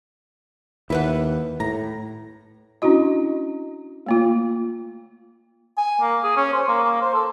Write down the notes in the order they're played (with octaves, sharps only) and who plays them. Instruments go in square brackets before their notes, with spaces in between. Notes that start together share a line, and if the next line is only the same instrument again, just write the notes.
[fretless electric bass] D#2 [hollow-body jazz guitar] E4 B4 F#5
[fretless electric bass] A2 [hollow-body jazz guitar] A#5
[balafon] C#4 D4 E4 F#4 D#5
A3 A#3 F4
[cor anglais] G#5
A#3
G#4
C#4
C5
A#3
A#3
C5
A4